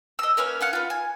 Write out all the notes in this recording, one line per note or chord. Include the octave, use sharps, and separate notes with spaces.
D#5 E6
A#3 C#4 B4 C#5
C#4 F5 F#5 F#6
F4 B4
G#5